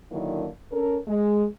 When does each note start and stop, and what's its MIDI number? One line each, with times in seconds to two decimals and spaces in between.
0.12 0.48 50
0.12 0.48 51
0.12 0.48 54
0.12 0.48 58
0.12 0.48 62
0.12 0.48 64
0.72 0.98 61
0.72 0.98 69
0.72 0.98 70
1.08 1.46 56